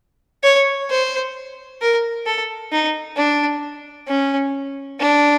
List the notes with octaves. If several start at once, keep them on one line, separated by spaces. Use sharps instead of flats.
C#5
C5
A#4
A4
D#4
D4
C#4
D4